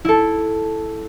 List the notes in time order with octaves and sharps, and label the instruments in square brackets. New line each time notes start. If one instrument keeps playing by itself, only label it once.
[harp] E4 A4